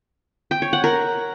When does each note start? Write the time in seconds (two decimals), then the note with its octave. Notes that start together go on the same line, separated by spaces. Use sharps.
0.51 G5
0.62 C#5
0.73 F#5
0.84 A#4